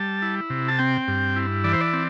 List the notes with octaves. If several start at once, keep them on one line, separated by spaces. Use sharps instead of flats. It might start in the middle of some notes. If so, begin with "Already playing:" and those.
Already playing: G3 A5
E4
C3
A5
C4 G5
G2
E4
E3 D5
C5
D5
C4